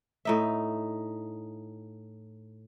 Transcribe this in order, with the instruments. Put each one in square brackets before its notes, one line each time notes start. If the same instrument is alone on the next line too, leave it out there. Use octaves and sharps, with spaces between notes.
[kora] A2 D#4 E5